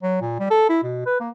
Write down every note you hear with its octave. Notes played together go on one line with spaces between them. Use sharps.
F#3
A#2
G3
A4
E4
B2
B4
A#3